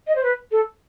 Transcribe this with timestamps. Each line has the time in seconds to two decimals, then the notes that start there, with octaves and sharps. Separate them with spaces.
0.07 D#5
0.15 C5
0.23 B4
0.51 A4